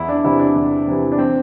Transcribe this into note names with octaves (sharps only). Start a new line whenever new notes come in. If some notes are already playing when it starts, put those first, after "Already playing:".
Already playing: E2 E4
D4
C3 E3 E4
D4
E2
C3 E3
D4
C4